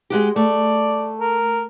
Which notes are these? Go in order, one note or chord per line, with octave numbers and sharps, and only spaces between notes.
G#3 F#4 G4
A3 D5
A#4